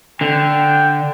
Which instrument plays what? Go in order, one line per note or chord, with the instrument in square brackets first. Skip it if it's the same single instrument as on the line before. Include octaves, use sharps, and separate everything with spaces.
[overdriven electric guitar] D3 [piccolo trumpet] G5